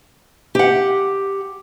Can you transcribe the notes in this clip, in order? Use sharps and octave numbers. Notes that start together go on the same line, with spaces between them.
G4 F#5